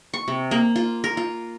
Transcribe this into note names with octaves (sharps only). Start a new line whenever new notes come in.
C#6
C3
A#3
F4
A#4
F4